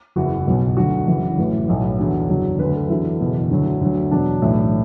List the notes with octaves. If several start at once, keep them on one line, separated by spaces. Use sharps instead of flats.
F#1 E2 E3 F#4
B1 B2 F#3
D2 D3 F#3 F#4
F#1 F#2 E3
A1 A2 E3
B1 A2 F#3
E2 D3 F#3
F#1 E2 D3 F#3
D2 D3 F#3 B4
A4
E2 D3 F#3 E4
F#1 E2 B2
D2 D3 F#3
D2 D3 F#3
E1 E2 B2 F#3 D4
B1 A2 E3